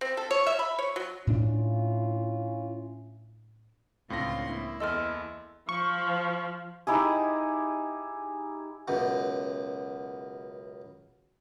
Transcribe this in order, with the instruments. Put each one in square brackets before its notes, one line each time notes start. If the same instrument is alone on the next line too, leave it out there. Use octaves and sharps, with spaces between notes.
[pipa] C4
A4
C#5
E5
B5
C#5
F#3
[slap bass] A2 D4 [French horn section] C#4 E4 F4
[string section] C#2 D3 C6 [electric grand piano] A2 C4 A#6 [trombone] F4
[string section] A#3 [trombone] E4
[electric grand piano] E2 A4 E6 [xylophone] D#5 C6 F6
[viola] F3 [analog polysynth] C#6
[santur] D#4 E4 G4 G#4
[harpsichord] C#2 F#2 B2